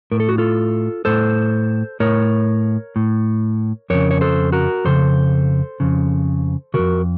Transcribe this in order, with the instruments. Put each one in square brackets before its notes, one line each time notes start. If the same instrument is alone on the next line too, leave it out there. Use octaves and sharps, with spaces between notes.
[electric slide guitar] A2 A#4
A4
F#4
F4 A4
A2 A4 C5
A2 A#4 C#5
A2
F2 C#3 A#4 C#5
C#5
A4 C5
F#4 A#4
F2 C#3 A4 C5
F2 C#3
F2 C#3 F#4 A#4